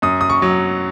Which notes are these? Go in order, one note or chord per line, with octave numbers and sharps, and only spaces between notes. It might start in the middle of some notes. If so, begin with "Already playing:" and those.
F#2 D#6
D#6
C#6
F#3